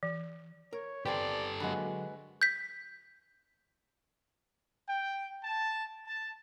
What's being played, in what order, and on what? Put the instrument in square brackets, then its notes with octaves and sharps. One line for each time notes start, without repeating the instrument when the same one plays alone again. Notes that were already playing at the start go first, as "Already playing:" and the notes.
[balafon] E3
[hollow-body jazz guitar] A#4 [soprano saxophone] C#5
[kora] C4 [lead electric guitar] G4 A4 [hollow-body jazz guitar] B4 G5 G#5 [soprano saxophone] D5
[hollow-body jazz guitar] D3 F#3 [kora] G#3 F#4 B4 [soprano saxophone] A#3
[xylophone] G6 B6
[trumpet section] G5
A5
A5